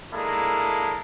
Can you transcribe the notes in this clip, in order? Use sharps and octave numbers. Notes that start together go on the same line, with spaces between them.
G#3 A#3 D4 E4 A4 A#4